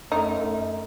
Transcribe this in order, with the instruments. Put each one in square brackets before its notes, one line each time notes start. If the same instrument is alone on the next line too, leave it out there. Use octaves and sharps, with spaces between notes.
[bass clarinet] F#2 [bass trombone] A3 [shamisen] D#4